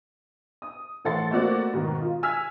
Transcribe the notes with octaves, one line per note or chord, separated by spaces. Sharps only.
D#6
A2 E3 A4 F#5 C6 A6
A3 A#3 C4 F#4 D5
G#2 B2 D#3
D#4 F4
G#5 E6 F6 G#6 B6